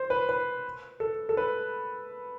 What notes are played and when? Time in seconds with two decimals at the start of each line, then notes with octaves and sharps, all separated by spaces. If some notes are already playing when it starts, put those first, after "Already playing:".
Already playing: C5
0.10 B4
0.29 B4
1.00 A4
1.29 A4
1.37 B4